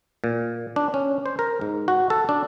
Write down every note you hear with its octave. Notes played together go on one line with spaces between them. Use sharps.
A#2
D4
C#4
C5
A#4
G#2
F#4
A4
D4